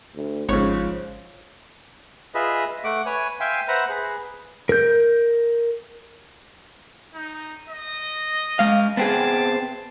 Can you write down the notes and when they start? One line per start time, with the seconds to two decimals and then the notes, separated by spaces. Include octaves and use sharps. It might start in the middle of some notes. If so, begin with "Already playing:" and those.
0.15 D2
0.49 G#1 G#2 C#3 F3 C#5
2.35 F4 G#4 B4 D#5 E5
2.84 A3 F#5 D6
3.06 B4 C#5 G#5
3.40 E5 F5 G5 G#5 C6
3.68 B4 C5 E5 F#5 A#5
3.89 G#4 B4
4.69 A#4 G6
7.15 D#4
7.69 D#5
8.59 G#3 F5
8.97 B3 C4 G#4 A5